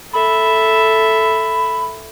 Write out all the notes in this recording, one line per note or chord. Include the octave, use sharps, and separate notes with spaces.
A4 E5 B5